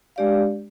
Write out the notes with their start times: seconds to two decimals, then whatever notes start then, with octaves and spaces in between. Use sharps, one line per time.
0.16 G#3 D4 G4 D5 F5